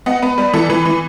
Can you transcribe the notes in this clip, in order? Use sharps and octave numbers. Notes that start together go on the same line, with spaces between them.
B3 D#5 F#5
B3 B4
G3 B4
E3 A4
E3 B4
E3